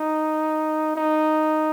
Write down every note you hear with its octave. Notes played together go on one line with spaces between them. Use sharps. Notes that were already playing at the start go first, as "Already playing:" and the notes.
Already playing: D#4
D#4